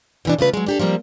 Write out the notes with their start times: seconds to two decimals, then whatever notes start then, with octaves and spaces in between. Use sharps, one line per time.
0.25 B2 E3 D4
0.39 C#3 A3 F4 B4
0.53 F#3 G#3
0.66 D4 G4 A4
0.79 F3 G3 A#3 C4